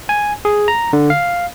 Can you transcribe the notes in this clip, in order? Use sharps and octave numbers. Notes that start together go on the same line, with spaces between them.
G#5
G#4
A#5
D3
F5